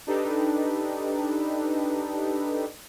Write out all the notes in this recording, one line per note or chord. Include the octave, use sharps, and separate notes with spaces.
D4 D#4 G4 A4 B4